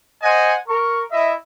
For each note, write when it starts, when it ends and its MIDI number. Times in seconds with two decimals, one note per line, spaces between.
0.22 0.55 72
0.22 0.55 75
0.22 0.55 78
0.22 0.55 80
0.68 1.02 70
0.68 1.02 85
1.12 1.34 64
1.12 1.34 75
1.12 1.34 76